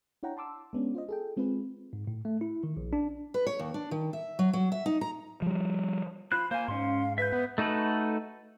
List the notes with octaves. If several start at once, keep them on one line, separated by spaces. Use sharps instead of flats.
D4 E4 C#5 F#5 G5 A#5
A5 C6 D6 E6
G#3 B3 C#4 D4
F4 C5 D#5
G#4 A4 G5
G#3 C4 F4 G#4 B4
G#2
A2
A3
E4
D#3
A#1
D4
B4
C#5
D#2
D4
D#3
E5
F#3
F#3
E5
D#4
A#5
F3 G3
F4 C5 B5 F#6
A#3 C5 F5 G#5
G#2 C#4 C6
B4 E5 G6
B3
A3 D#4 F#4 A4 B4